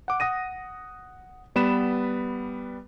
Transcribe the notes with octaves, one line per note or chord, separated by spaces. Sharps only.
F#5 D6
F#5 D#6 A#6 D#7
G3 B3 B4 B5 E7